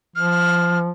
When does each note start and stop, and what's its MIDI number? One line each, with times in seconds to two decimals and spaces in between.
0.16 0.90 53
0.16 0.79 89